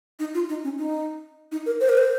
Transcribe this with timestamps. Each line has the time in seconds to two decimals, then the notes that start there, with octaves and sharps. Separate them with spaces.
0.19 D#4
0.34 F4
0.49 D#4
0.64 C#4
0.79 D#4
1.52 D#4
1.66 A#4
1.81 C5
1.89 A#4
1.98 C5